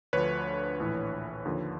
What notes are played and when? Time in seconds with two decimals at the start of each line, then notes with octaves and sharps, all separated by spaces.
0.13 D2 D3 F3 B4 C#5
0.80 A#1 A2 E3
1.45 D#2 D3 F3